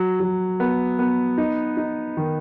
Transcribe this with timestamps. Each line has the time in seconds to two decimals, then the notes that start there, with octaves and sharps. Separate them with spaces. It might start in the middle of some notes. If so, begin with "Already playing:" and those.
Already playing: F#3
0.20 F#3
0.60 B3
0.99 B3
1.38 D#4
1.77 D#4
2.17 D#3